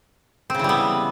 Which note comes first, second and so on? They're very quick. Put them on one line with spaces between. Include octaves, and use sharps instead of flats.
C4 C#3 E3 G3 B3